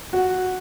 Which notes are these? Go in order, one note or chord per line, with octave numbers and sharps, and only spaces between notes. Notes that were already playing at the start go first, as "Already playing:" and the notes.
F#4